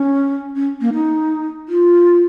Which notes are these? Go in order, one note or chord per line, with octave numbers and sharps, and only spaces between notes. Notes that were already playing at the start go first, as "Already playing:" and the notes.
Already playing: C#4
C#4
A#3
D#4
F4